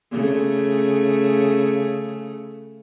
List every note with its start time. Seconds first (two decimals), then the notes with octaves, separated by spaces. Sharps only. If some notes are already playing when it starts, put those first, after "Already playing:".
0.11 C#3 A3